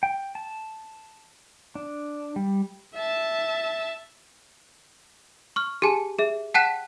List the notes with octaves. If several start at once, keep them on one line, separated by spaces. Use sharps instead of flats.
G5
A5
D4
G3
E5 A5
C#6 F6
G4 G#4 G#5 A5
G#4 E5
F#5 G5 A5 F#6 B6 E7